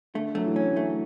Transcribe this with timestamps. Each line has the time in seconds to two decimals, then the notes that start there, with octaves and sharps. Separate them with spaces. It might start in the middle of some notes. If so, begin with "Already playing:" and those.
0.14 D3 A3
0.35 F#3 A3
0.46 E3
0.56 C#4
0.77 A3